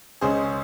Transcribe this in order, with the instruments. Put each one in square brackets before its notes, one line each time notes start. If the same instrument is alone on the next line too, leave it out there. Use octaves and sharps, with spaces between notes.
[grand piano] C#2 C#3 G#3 C#4 G#4 C5